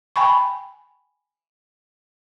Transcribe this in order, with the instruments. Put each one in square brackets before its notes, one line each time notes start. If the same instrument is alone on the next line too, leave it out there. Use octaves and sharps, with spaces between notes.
[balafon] G5 G#5 B5 C#6